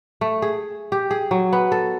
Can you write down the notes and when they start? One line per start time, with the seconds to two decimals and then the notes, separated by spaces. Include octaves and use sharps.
0.21 A3
0.42 G#4
0.92 G4
1.11 G#4
1.31 F#3
1.53 B3
1.72 A4